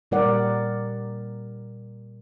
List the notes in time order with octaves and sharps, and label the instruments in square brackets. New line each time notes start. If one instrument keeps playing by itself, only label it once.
[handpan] A#2 G3 A#4 D5 F#5